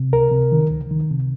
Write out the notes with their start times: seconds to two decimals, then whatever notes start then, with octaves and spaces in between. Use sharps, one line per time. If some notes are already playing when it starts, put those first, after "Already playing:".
Already playing: C3
0.13 C#2 A#4
0.32 C3
0.52 D#3
0.71 C#2
0.91 D#3
1.11 C3